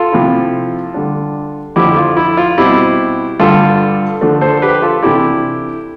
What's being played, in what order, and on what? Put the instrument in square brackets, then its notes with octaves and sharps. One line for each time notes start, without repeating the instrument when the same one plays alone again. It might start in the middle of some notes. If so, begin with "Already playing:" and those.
Already playing: [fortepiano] F4 A4
C3 F3 A3 E4
D3 G3 D4
F2 D3 F3 E4 G4
F4
E4
F4
B2 G3 C4 E4 G4
G2 D3 A3 F4 A4
D3 F3 A3 D4
A4 C5
G4 B4
F4 A4
C3 E3 A3 D4 E4 G4